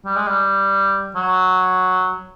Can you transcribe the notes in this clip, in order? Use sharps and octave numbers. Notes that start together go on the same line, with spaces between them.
G3
G#3
G3
F#3